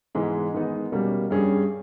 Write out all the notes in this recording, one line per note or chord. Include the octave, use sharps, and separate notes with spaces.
G#2 E3 G#3 B3
D#3 G#3 B3 D#4
B2 G3 A#3 C#4
G2 G3 C#4 G#4